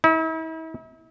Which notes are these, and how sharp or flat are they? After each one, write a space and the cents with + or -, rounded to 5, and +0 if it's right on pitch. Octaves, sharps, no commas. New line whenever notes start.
E4 -40